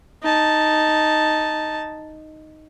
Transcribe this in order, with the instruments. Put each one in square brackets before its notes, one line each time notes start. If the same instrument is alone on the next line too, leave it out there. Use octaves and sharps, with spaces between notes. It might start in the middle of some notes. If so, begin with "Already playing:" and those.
[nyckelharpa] D#4 A5